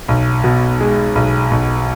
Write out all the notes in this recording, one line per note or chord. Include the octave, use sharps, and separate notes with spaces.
B1
B2
G#3
B1
B1